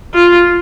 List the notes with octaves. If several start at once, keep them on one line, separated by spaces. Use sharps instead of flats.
F4